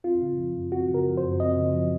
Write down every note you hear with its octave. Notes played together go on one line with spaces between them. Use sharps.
C4 F4
C#3
F3
F#2
C4 F#4
C#3 A#4
F3
C5
F#2
C4 D#5
C#3
F3